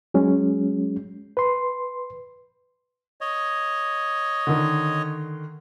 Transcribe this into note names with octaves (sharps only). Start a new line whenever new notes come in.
F#3 G#3 C#4
B4 C6
C#5 D#5
D3 D#3